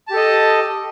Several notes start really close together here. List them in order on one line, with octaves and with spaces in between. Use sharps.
A5 G4 A4 D#5